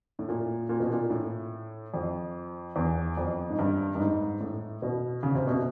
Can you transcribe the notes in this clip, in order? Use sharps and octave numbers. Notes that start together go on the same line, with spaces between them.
A2
A#2
A#2
B2
A#2
A2
F2
E2
F2
G#2
G2
G2
G#2
A2
B2
C#3
C3
B2